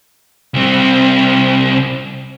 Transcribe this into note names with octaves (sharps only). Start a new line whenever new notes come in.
C2 C4